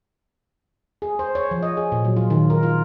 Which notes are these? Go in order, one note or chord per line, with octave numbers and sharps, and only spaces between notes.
G#4
C5
C#5
F3
D#5
G#4
A#2
F#3
F4
D#3
A#4
F4